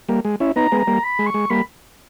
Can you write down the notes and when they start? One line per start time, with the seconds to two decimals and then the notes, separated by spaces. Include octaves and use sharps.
0.08 G3 A#3
0.25 G#3
0.40 C#4 E4
0.56 B3 D#4 A#5
0.72 G#3 B3
0.79 A#5
0.87 G3 A#3
1.04 B5
1.19 G#3
1.26 C#6
1.34 G#3
1.50 G3 A#3 B5